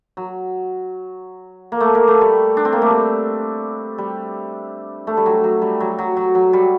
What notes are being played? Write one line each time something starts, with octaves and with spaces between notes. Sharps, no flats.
F#3
A#3
A3
A#3
A3
G3
D4
C4
A#3
A3
G3
G3
A3
G3
F#3
F#3
G3
F#3
F#3
F#3
F#3
G3